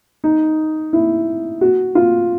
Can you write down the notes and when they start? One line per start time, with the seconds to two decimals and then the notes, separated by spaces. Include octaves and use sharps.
0.24 D#4
0.93 E4
1.61 F#4
1.95 F4